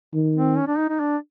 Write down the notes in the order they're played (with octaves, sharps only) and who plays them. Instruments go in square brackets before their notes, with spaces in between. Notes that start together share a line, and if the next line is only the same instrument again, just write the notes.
[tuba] D#3
[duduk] C4
C#4
D4
D#4
D#4
D4